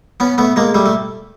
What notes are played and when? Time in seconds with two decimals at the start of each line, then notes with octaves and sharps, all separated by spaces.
0.20 B3 C#4
0.38 A3 B3
0.56 G#3 A#3
0.74 G3 A3
0.86 A3